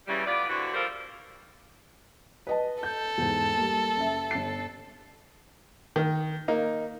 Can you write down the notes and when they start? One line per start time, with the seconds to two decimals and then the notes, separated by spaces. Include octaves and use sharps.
0.08 C#3 E3 G3
0.26 A2 B3 F4 D5
0.49 D3 E3 C4 F#4
0.74 F3 G3 F4 A4 A#4 C5
2.47 B4 D#5 A5
2.83 A4 G6
3.18 E2 G#2
3.57 G3 A#3
3.97 F#1 E5
4.31 G1 A6 C7
5.96 D#3
6.48 A#3 D#4